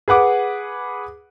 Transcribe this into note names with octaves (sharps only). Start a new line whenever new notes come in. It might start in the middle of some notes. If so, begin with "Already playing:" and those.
G#4 B4 F#5 D6